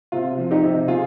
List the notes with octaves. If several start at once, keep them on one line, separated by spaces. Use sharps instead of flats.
C3 F4
F3
D#4 G4
C3
C3 F4 G#4